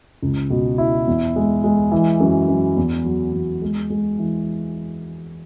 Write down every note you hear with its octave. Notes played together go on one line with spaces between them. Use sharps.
C#2
B2
E4
E2
G#3
G#3
E3
F#2
F#2
E2
F#3
E2
G#3
G#3
E3